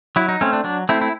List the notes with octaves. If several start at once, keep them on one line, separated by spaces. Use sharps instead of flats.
F#3 E4
D#4
A3 C4 C#4
D4
F#3 D4
A3 C4 E4
E4